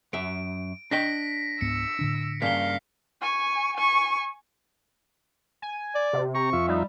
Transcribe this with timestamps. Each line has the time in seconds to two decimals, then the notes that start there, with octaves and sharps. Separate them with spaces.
0.13 F#2 E5 D7
0.91 D4 D#5 G5 A#6 B6 D7
1.61 C#2 G#2 B3 E6 C#7
1.99 A2 D3 D4
2.42 G2 C#3 A#3 F5 B6 G7
3.21 G#5 C#6
3.76 G#5 C#6
5.62 G#5
5.95 D5
6.13 C3
6.35 G4 A#5 C#6
6.53 F2 F4 E5
6.68 G3 D#4